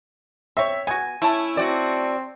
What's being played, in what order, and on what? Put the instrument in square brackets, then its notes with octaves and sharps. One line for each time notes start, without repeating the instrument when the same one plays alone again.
[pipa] C4 C#5 [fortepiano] E5
[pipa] B3 F#4 [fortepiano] G#5
[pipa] A3 C#4 A5 [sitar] E4
[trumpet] C4 [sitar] F#4 D5